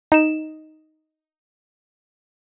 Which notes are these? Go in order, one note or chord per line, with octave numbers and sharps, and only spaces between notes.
D#4 E7